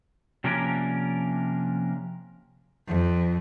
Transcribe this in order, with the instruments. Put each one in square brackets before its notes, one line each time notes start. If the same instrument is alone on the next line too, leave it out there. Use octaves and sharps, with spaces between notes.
[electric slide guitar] C3 F3 A#3 C#4 D4 A#4
[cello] F2